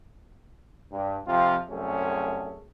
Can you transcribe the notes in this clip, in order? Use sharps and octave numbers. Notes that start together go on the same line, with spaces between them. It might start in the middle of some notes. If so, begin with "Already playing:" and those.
G2
F2 C3 F3 C4 F4
C2 F#2 A3 C#4 G#4